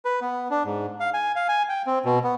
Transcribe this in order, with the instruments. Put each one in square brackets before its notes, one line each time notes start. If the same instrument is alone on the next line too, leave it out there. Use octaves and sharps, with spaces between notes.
[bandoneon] B4
B3
D4
G#2
F5
G#5
F5
G#5
G5
C4
B2
B3